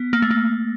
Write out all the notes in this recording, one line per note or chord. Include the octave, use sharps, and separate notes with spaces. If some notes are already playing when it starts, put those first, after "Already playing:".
Already playing: B3
A#3
A3
A#3